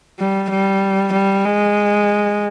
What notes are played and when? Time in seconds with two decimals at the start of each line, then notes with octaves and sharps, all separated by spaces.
0.19 G3
0.50 G3
1.13 G3
1.45 G#3